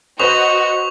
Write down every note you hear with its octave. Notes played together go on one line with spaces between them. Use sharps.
F#4 B4 C5 D#5 C#6 D#6 F7